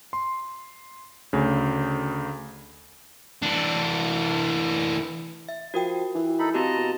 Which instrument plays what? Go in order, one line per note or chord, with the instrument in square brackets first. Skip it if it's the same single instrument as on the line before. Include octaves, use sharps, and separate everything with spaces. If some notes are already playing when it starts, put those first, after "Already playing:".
[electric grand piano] C6
D2 C#3
[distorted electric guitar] E3 D4
[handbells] E5
[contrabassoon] F3 [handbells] F#4 A#4 G5
[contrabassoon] E3
[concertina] D#4 A4 B5
[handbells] C4 F#4 G4 [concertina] D#5 A5 A#5
[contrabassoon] B2